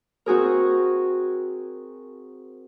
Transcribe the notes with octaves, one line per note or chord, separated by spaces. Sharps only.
C4 F#4 G#4 A#4